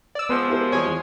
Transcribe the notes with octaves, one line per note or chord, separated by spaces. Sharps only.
D5 E6
F3 G#3 B3
E4 G4 A#4
E2 G3 C#5 G#5 D#6
E2